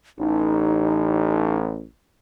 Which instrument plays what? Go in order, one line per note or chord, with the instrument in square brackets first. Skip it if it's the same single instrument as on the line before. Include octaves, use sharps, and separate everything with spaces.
[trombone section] A1 [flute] D#4